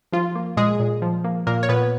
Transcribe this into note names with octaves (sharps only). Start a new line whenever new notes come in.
F3 F4
A#3
A#2 G#3 G#4
A#2
F3
A#3
A#2 A#3 A#4
C#5
A#2 B3 B4